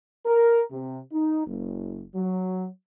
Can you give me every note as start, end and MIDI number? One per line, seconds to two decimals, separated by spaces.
0.26 0.62 70
0.71 1.00 48
1.12 1.46 63
1.47 2.05 30
2.15 2.67 54